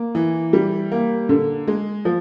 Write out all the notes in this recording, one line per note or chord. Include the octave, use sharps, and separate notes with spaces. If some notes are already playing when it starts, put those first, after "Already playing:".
Already playing: A#3
E3
G3
A#3
D3
G#3
F3